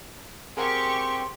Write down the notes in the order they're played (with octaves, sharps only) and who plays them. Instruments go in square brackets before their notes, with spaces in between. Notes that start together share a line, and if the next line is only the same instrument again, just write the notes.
[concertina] C4 [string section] G4 C#6 [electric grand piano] G#4 A#4 F#5 [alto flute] C6